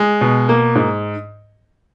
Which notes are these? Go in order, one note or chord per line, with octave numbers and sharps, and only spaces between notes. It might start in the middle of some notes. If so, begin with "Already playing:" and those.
Already playing: G#3
B2
A#3
G#2